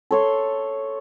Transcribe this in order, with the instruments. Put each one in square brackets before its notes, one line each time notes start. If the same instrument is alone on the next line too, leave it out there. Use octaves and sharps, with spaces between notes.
[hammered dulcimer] A4 C#5 C6